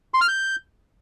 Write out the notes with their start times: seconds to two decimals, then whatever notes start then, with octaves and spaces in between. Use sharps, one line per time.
0.14 C6
0.21 F6
0.28 G6